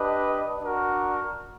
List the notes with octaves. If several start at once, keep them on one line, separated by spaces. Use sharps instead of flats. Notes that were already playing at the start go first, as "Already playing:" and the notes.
Already playing: D4 G4 B4 D#5
D4 F#4 A#4